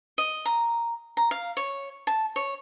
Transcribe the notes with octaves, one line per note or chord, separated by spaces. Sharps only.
D#5
A#5
A#5
F5
C#5
A5
C#5